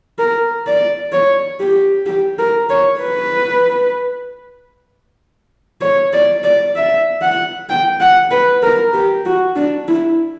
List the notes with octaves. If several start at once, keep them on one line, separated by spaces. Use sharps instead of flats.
A#4
D5
C#5
G4
G4
A#4
C#5
B4
C#5
D5
D5
E5
F#5
G5
F#5
B4
A#4
G4
F#4
D4
E4